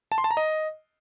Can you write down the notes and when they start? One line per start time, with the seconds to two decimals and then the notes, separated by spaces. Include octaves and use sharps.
0.12 A5
0.18 C6
0.24 A5
0.31 A#5
0.37 D#5